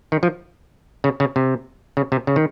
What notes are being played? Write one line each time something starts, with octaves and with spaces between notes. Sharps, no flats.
D#3
F3
C#3
C#3
C3
C#3
C3
C#3
D#3